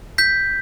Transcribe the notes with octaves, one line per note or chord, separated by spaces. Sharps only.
G6 B6